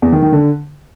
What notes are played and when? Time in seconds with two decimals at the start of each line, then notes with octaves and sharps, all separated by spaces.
0.02 E2
0.12 D#3
0.22 D#3
0.32 D3